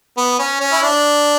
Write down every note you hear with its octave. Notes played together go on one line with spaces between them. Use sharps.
B3
C#4
C#4
E4
D4